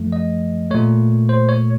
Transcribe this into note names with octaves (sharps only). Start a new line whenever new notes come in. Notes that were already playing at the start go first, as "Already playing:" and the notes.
Already playing: F#2 F3 A3
D#5
A#2 A3 C#5
C5
C#5